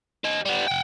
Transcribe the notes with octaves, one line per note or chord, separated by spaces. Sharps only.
G4 D#5
G3 B3
F#5 G5